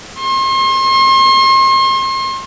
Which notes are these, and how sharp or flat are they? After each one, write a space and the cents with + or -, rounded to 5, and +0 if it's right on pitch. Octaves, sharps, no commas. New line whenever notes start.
C6 +40